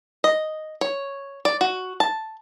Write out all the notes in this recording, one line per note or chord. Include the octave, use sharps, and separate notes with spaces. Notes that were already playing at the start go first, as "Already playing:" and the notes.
D#5
C#5
D5
F#4
A5